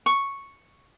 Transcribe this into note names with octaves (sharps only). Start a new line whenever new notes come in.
C#6